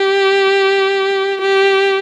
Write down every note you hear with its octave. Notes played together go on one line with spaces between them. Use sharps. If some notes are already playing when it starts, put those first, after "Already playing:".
Already playing: G4
G4